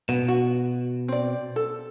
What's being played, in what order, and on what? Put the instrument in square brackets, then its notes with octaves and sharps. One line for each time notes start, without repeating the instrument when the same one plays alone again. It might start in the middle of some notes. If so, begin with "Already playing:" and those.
[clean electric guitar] B2 [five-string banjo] B3
[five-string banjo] F#4
C4 D5
A4